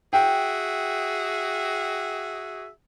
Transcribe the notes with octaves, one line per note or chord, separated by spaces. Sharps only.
F#4 G#4 E5 G5